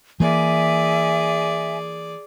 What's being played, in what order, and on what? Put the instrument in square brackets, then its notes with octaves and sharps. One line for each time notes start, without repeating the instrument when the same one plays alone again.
[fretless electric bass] E3 A#3 [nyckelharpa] G#4 D5 [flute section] E5 G#5